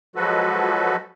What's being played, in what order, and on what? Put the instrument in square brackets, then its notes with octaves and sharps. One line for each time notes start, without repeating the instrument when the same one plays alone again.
[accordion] F3 F#3 G#3 F#4 A4 B4